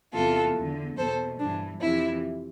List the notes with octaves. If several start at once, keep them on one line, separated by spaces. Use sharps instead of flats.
E2 C3 E3 F4 A4
E2 D3
E2 B2 A4 C5
G2 E3 D4
F2 C3 E3 E4